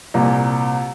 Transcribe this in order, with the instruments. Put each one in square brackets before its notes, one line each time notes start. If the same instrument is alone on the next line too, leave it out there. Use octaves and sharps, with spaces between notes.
[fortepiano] C2 A#2